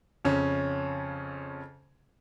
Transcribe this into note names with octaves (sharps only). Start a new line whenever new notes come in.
F2 C#3 C#4